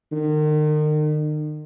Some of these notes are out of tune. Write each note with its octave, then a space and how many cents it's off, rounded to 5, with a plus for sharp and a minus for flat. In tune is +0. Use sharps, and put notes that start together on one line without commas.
D#3 -40